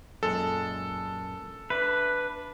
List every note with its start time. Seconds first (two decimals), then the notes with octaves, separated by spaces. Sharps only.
0.23 F#2 A#2 G#3 A4
1.70 D4 B4 E5